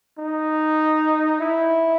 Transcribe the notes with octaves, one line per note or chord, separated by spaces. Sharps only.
D#4
E4